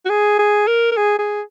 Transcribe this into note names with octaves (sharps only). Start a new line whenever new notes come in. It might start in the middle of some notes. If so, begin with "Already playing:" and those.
F#4
G#4
G#4
A#4
A#4
G#4
G#4